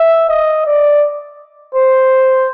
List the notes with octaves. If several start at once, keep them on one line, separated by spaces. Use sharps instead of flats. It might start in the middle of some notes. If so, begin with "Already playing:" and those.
Already playing: E5
D#5
D5
C5